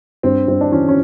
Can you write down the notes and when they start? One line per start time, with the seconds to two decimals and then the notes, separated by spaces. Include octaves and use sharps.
0.23 G2 C4
0.48 G2 C4
0.61 D4
0.72 E3 C#4
0.88 C#4